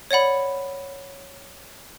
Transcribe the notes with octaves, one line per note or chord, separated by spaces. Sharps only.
C#5 D5 F#5 B5